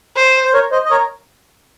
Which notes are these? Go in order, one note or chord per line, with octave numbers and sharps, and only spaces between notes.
C5
C5
A#4 C#5
C5 D#5
D#5
A#4 C#5